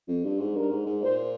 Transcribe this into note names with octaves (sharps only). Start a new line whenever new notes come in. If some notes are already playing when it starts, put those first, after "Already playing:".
F2
G2
G#2
G2 A#4
G#2
G#2
A#2 C5